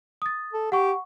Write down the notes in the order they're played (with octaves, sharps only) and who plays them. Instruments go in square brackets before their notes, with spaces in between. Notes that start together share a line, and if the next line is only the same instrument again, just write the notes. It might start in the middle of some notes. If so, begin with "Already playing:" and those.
[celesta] D#6 A6
[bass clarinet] A4
[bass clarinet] G4 [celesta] F#5 C#6